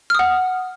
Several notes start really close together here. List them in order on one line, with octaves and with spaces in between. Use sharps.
F6 D#6 F#5